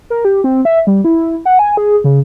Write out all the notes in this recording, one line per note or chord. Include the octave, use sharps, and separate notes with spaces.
A#4
G4
C4
E5
G3
E4
F#5
G#5
G#4
C#3